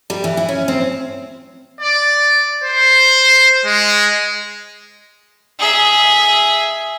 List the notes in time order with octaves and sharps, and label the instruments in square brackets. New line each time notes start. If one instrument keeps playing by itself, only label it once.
[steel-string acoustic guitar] G3
E3
E4
C#4
C4
[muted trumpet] D5
C5
G#3
[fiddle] G#4 E5